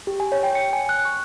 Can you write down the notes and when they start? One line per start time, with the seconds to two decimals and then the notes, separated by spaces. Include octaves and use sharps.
0.07 G4
0.20 G#5
0.32 C#5
0.43 G5
0.55 C#7
0.73 G#5
0.89 F#6
1.05 C#6